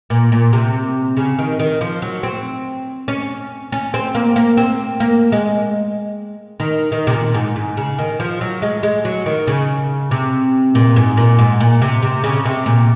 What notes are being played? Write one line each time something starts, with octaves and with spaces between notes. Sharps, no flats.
A#2
A#2
C3
C#3
D#3
D#3
F3
F#3
C4
C#4
C#4
C4
A#3
A#3
C4
A#3
G#3
D#3
D#3
C3
A#2
G#2
G#2
C#3
D#3
F3
F#3
G#3
G#3
F#3
D#3
C#3
C3
A#2
G#2
A#2
G#2
A#2
C3
C3
C#3
C3
A#2